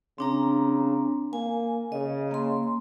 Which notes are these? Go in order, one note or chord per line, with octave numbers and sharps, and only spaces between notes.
C#3 C4 D4 A#5
A#3 G#5
C#3 D#5
A#3 C6